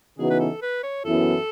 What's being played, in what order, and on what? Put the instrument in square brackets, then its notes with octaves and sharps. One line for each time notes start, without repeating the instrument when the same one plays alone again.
[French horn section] C#3 E3 B3 D#4 F#4 [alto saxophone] G#4
[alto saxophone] B4
A4
B4
C#5
[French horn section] F#2 E3 B3 E4 [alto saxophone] A4